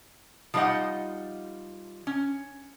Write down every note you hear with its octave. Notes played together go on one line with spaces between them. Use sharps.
F3 G3 D#4 B4 D#5 F#5
C#4